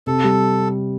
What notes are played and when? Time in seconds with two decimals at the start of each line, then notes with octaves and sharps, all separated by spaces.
0.07 C3 A4
0.24 G3